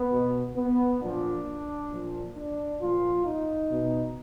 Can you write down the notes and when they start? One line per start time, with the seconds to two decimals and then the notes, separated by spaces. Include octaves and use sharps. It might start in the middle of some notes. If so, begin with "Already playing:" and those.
Already playing: B3
0.11 B2
0.56 B3
1.01 A#2 F3 D4
1.92 A#2 F3
2.36 D4
2.81 A#2 F3 F4
3.25 D#4
3.71 B2